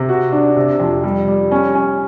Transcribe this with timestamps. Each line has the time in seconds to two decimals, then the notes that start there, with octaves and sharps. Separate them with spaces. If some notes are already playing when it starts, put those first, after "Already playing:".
Already playing: C3
0.09 F#4
0.32 D4
0.57 C3
0.80 F2
1.03 G3
1.28 G3
1.51 C#4
1.75 C#4